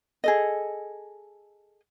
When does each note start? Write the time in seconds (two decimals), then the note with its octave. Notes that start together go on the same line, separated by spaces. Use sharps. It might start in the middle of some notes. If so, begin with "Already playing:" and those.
0.24 G#4 A4 D#5